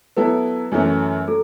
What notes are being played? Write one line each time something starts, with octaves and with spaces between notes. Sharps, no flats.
F#3 B3 E4 A4 B4
F#2 E3 A3 C#4
F#3 A4